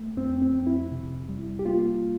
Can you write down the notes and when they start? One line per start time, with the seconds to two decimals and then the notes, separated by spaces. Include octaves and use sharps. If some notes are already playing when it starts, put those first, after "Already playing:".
Already playing: A3
0.17 F2 C4
0.42 C4
0.55 F2
0.67 E4
0.92 C3
1.29 G3
1.59 G4
1.65 A#3 F4